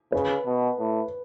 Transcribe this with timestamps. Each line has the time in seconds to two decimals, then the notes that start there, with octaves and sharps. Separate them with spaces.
0.12 C#3 B4
0.46 B2
0.79 A2